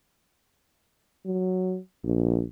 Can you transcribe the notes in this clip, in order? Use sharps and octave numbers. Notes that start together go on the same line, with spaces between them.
F#3
A#1